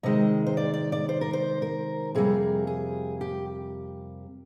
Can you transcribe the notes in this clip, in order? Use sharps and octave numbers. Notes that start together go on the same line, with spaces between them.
C3 D#3 G#3 D#5
C5
D5
D5
D5
C5
A#4
C5
A#4
F2 C3 G3 A#3 G#4
G#4
G4